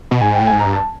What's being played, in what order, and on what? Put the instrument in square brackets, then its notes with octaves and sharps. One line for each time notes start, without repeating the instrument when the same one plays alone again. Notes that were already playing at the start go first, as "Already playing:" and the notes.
[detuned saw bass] B2
[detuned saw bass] G#2 [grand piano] G#5
[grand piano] G5
[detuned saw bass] A2
[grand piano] G#5
[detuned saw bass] G#2
[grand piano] A#5
[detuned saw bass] G2
[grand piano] A5